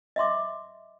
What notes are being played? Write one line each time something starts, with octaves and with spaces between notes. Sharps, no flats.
D#5 E5 C6 D6